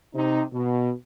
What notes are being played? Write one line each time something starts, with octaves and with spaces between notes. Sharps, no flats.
C3 D#4
B2